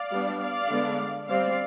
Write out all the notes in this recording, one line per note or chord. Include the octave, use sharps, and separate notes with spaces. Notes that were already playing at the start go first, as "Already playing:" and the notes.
Already playing: D5 F5
G3 B3 D4
D5 F5
D3 G#3 B3 D4
G3 C4 D5 F5